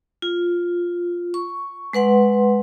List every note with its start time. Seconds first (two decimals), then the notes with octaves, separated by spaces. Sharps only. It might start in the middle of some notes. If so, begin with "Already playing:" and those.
0.22 F4
1.34 C#6
1.93 G#3 B4 F#5 C6